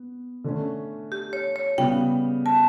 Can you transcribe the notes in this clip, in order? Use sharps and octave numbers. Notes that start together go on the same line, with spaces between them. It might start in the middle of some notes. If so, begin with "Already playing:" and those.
Already playing: B3
D3 A3 C#4
G4
C#5
C#5
C#3 G3 B3 G5
A5